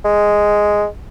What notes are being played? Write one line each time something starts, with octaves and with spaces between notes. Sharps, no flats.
G#3